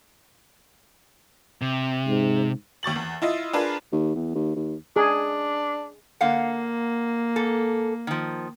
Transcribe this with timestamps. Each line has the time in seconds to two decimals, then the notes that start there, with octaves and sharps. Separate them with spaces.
1.61 C3
2.07 G#2
2.83 D#2 C#6 A6 F#7
2.96 E2
3.22 E4 F4 D#5
3.53 D4 F4 G#4 A#4 B4
3.92 D#2
4.15 E2
4.35 D#2
4.56 D#2
4.96 D4 G#4
6.21 D3 A#3 F5 F#5
7.36 G#2 A4
8.07 D#3 F3